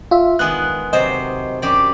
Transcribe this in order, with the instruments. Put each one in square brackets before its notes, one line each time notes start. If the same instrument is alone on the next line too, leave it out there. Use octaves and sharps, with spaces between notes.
[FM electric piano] F4 E5
[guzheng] D#3 G#3 B3 [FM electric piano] F#6
[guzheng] C3 F#3 C5 [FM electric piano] D#5
[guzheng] F#2 G4 D5